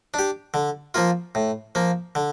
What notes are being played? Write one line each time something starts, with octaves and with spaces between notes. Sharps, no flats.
D4 G4
D3
F3 A#3 F4
A2
F3 A#3
D3